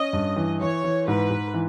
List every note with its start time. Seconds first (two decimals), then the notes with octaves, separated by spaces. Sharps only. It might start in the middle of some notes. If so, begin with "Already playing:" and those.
Already playing: C#4 D#5
0.13 G2
0.36 E3
0.60 E3 C#5
0.84 E3
1.08 G#2 B4
1.30 G#2
1.54 E3